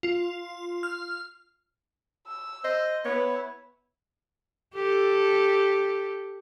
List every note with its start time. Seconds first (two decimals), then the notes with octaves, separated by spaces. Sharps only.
0.03 F4
0.83 F6
2.27 E6
2.64 C5 D#5
3.05 B3 E4 C#5
4.74 G4 A4